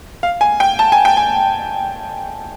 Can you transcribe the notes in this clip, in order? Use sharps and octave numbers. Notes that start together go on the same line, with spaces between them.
F5
G#5
G5
A5
G#5
G5
G#5